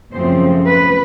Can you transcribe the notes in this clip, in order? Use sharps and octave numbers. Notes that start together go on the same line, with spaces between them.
F#2 C#3 F3 A3 C4 C5
B4